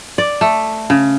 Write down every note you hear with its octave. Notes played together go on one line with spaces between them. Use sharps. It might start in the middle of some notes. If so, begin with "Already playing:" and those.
D5
A3
C#3